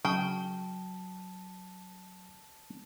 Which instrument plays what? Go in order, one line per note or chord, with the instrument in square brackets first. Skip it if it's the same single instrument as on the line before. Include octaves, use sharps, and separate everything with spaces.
[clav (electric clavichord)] C#3 [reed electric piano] F#3 [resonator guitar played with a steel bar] G5 [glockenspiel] A5